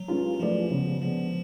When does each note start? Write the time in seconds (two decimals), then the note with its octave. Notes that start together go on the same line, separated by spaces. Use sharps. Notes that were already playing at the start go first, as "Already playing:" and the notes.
Already playing: F#3
0.08 G#3 C#4 F4 B4
0.39 F3 A3 F4 G#4 B4 D5
0.70 C#3 G#3 B3
1.02 D3 F3 G#3 B3